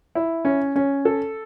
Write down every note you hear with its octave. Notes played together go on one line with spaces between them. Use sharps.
E4
C#4
C#4
A4